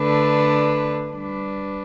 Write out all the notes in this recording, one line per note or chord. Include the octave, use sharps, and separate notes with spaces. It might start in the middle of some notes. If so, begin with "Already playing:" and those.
Already playing: D3 A3 D4 B4
G3 D4 B4